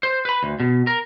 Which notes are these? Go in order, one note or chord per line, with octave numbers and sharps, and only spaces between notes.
C5
B4 B5
D2
B2
A#4